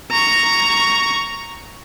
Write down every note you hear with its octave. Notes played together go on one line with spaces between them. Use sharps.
A#5 C#6